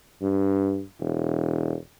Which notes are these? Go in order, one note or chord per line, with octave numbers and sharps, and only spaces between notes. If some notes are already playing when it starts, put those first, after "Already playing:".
G2
E1